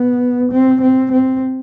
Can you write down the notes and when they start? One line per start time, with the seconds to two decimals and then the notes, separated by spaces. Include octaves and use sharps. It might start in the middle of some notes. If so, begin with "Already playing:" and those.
Already playing: B3
0.52 C4
0.82 C4
1.12 C4